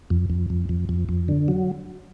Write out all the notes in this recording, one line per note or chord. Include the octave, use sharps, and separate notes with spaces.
F2
F2
F2
F2
F2
F2
D3
F#3